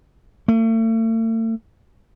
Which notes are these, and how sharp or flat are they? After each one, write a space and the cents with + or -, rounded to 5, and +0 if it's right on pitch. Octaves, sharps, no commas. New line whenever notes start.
A3 +40